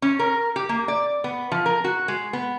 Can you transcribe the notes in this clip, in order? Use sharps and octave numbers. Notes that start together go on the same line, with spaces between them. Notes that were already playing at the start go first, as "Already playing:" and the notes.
C#4
A#4
G4
A#3
D5
B3
F3
A#4
F#4
G#3
B3